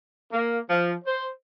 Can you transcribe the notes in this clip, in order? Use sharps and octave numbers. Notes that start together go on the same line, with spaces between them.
A#3
F3
C5